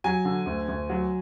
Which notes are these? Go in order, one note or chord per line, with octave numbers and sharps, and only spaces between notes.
F#3 G#5
D3
D2
D2
F#3